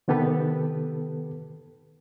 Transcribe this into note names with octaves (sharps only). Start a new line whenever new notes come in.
C3 D#3 B3 G4 A4 B4